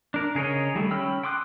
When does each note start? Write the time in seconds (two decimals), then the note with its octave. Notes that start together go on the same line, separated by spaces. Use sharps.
0.14 D4 A#4
0.35 C#3 G#4 A#4 C#5 D#5
0.74 D#3 G3 A3
0.91 C#4 G5 B5 E6 F6
1.23 G5 C6 D6 D#6 F#6